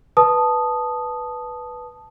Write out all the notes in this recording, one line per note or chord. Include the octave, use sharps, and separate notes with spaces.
B4 A5 D#6